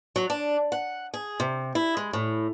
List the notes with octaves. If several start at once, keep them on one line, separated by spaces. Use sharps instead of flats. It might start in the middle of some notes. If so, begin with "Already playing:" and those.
F#3
D4
F#5
G#4
C3
E4
G#3
A2